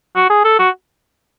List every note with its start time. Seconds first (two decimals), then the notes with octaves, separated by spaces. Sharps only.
0.16 F#4
0.30 G#4
0.45 A4
0.59 F#4